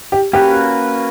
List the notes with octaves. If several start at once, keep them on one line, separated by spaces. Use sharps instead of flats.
G4
A#3 C#4 F#4 G4 B4